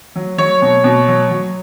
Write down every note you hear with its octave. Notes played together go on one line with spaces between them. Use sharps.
F#3
F#3 C#5
B2
B2
F#3
F#3